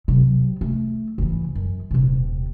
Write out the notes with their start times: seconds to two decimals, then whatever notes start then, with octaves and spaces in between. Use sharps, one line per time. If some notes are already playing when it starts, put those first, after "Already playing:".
0.08 C3 F#3
0.61 A3
1.18 C#3 E3
1.55 F#2
1.91 D#1 C3